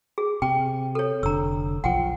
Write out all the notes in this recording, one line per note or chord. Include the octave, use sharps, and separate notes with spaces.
G#4
C3 G5
A4 C#5
F1 D3 A#5 E6
B1 F3 F#5 G5